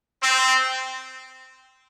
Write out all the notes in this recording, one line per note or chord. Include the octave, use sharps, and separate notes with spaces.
C4